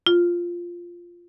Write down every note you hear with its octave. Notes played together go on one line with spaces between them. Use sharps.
F4